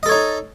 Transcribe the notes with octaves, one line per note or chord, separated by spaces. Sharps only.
D#4 A4 C#5 D#5